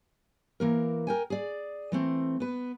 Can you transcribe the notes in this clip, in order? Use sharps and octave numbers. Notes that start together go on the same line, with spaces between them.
E3 A#3 A#4
A#4 G5 G#5
G#4 D5
E3 A3 C4
B3 B4